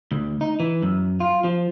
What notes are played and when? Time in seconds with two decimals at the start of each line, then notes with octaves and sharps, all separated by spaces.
0.12 D2
0.41 D#4
0.60 E3
0.82 F#2
1.20 F4
1.44 F3